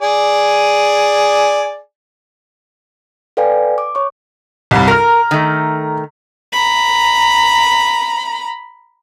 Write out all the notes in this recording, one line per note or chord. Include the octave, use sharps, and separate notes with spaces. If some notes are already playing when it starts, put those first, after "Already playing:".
G#4 D5 G#5
A4 B4 D5 F5 G5 G#5
D6
C#5 C#6
C2 G2
A#4 A#5 F6
D#3 A3
A#5 B5